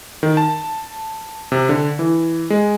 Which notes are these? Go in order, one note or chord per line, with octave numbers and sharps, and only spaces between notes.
D#3
A5
C3
D3
E3
G#3